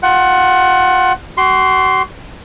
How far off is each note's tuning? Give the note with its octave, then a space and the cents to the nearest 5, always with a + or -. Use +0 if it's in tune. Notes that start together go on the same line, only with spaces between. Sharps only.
F4 +25 F#5 +15
F#4 +35 C6 +0